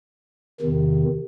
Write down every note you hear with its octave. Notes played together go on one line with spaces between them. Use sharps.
E2 C3 D#3